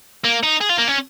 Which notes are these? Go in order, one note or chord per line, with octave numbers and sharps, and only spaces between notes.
A#3
D#4
G#4
F4
A#3
C#4